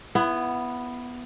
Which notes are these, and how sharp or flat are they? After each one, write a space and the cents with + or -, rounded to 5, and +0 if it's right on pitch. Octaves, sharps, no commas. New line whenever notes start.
B3 +0 E4 +25